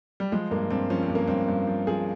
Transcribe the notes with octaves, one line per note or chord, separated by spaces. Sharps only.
G3
F3 G#3
G2 A#3
G2 C4
F3 C#4
C4
G2
A#3
G2 C4
G2
F3
F3 G#4